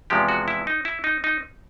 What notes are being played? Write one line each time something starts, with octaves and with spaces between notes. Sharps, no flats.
E2 C3 F3 G#3 G4
F#4
E4
D#4
E4
D#4
D#4